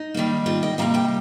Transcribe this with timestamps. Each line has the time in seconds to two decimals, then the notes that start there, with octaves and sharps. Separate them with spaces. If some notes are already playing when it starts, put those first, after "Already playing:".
Already playing: D#4
0.14 D#3 G3 A#3
0.46 C4 F4
0.63 D#5 G5
0.78 C3 G3 A#3 F5 A#5
0.94 D#5 G5